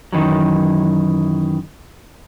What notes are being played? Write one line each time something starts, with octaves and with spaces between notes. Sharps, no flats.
F#2 A#2 D#3 E3 F#3